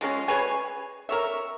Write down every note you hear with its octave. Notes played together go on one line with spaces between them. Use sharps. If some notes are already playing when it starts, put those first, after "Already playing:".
F3 G#3 C#4
G#4 B4 C#5 G#5
A#4 C#5 E5